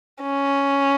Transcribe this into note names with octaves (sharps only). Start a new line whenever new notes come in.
C#4